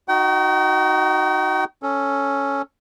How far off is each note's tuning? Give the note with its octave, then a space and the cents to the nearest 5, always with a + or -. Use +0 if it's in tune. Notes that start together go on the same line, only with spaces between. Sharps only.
D#4 +0 F#4 +0 G5 -40
C#4 +0 A4 +0